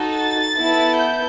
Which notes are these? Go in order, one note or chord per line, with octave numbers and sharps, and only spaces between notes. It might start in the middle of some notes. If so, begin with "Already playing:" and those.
Already playing: D#4 F#4 A4
A6
B3 E4 A4
G6